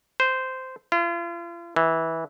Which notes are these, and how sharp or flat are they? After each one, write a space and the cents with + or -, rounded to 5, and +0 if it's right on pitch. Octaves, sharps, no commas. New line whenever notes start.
C5 -10
F4 -40
E3 -15